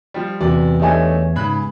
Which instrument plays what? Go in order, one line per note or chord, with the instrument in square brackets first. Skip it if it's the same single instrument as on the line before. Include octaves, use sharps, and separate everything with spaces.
[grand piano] F3 G3
[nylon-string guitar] E2 [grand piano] C3 D5 [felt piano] B3 F#4
[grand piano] A3 D4 D#4 [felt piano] G4 E5 G#5 [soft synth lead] C#5
[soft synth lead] G#2 [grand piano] C#3 B5 F#6